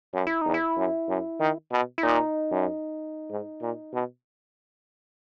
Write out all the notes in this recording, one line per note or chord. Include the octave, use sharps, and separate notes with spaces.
F#2
E4
E2 D#4
E4
F#2
F#2
D#3
B2
E4
A#2 D#4
F#2
G#2
A#2
B2